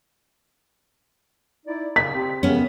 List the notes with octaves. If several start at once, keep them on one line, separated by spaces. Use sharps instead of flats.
D#4 E4 D5
C#3 D5 B6
C4 G4
F#2 C#3 B3 C#4